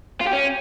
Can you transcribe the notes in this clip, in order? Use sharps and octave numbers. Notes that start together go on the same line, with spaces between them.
F4
G4
C#4